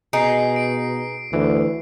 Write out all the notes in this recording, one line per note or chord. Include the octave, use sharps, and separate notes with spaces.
B2 D#4 G#4 C7 D7
D7
D2 E3